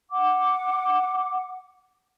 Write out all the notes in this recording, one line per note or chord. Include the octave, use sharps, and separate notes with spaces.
F#5 D6